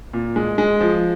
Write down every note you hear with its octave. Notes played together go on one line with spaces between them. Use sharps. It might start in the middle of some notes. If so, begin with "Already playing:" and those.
A#2
G#3
G#3
F3